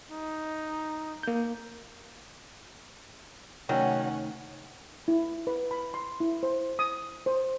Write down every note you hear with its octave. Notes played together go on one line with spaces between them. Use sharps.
D#4
A#3 G6
C3 D#3 F#3 A3 C#4 F#5
E4
B4
B5
C6
E4
C5
D#6
C5